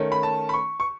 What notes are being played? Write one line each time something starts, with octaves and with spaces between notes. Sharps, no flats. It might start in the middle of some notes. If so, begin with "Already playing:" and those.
Already playing: D#3 A3 C#4
B5
A5
B5
C#6
C#6